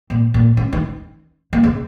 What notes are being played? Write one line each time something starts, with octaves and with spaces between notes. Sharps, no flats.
A#2
A#2
C#3
D#3
A#3
C#3